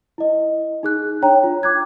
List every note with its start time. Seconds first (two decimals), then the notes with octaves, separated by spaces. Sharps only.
0.18 E4 D#5
0.83 D#4 G#4 F#6
1.22 D4 C#5 G5 A#5
1.44 F4
1.63 D6 F#6 G#6